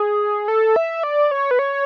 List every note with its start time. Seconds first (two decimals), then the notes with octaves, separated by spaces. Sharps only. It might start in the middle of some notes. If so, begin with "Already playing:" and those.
Already playing: G#4
0.48 A4
0.76 E5
1.03 D5
1.31 C#5
1.51 B4
1.59 C#5